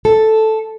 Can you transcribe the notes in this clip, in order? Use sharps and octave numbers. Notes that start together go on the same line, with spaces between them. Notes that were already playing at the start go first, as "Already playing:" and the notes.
A4